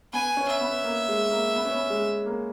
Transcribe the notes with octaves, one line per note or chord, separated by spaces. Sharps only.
B3 G#5
C#4
E5
B3
A#3
G#3
A#3
B3
C#4
B3
G#3
A#3